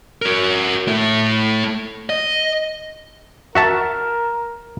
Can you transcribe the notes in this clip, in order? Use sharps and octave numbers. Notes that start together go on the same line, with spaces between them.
F#4 A#4
A3 E4
D#5
F#4 A#4 E5 A5